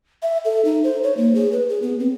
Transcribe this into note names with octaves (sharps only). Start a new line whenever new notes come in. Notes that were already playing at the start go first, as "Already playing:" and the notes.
E5
A4
D#4
C5
C#5
A#3
G#4
B4
G#4
B3
C4